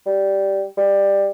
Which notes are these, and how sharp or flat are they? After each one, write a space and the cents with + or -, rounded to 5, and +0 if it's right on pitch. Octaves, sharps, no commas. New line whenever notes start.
G3 -10
G3 +15